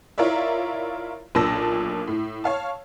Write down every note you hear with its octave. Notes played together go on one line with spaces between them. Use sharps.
E4 F4 A#4 C#5 D5 E5
B1 A#2 D4 A5 E6 A#6
A2
C#5 F5 A5